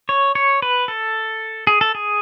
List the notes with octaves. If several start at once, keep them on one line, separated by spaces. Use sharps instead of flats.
C#5
C#5
B4
A4
G#4
A4
G#4